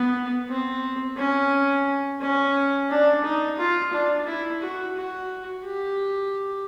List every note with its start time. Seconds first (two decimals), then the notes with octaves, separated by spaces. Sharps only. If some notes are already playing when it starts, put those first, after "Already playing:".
Already playing: B3
0.49 C4
1.17 C#4
2.21 C#4
2.90 D4
3.24 D#4
3.58 F4
3.93 D4
4.26 E4
4.62 F#4
4.96 F#4
5.65 G4